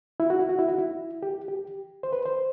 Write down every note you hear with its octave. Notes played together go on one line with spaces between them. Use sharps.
E4
F#4
E4
F#4
E4
F#4
E4
G4
G4
C5
B4
C5